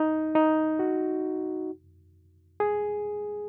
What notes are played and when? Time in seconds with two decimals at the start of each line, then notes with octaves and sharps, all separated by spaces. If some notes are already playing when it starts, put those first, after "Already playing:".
Already playing: D#4
0.35 D#4
0.79 F#4
2.60 G#4